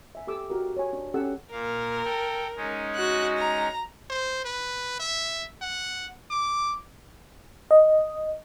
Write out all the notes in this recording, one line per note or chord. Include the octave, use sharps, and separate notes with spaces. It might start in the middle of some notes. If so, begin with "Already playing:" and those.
E5 G#5
G4 A4 D6 E6
F#4 G4 A#4
C#5 G#5
D4
C#4 G4 A4 F#5 E6
A#2 A#4 F5
A4 G5
G#3 C#4 D#4
F#4 F#6
A#5
C5
B4
E5
F#5
D6
D#5